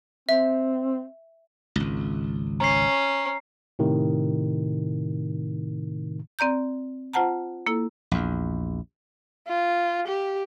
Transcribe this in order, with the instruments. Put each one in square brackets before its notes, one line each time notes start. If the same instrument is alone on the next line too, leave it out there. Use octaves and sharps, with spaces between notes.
[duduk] C4 [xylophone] E5
[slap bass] G#1 C#2
[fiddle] C#4 [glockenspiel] A#5 C7
[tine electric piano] A2 C3 D#3
[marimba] C4 D5 A#5 G6
F4 C5 F#5 A5 A#5
A#3 E4 A4
[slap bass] A#1 E2
[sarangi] F4
G4